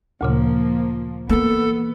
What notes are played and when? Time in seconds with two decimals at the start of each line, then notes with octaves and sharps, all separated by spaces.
0.21 D2 A#2 C#3 F3 A#3
1.29 E3 A#3 B3 A4